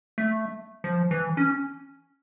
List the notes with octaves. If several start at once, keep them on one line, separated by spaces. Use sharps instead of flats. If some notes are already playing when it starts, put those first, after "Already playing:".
A3
F3
E3
C#4